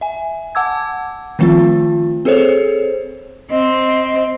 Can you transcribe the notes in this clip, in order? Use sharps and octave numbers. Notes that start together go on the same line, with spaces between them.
E5 G#5
F#5 A5 D6 E6 G#6
D#3 F3 A3 C4 F4
C4 G#4 A4 C5 C#5
C4 D#5